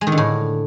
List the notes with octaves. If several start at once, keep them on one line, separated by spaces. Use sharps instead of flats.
G#3
D#3
D3
A2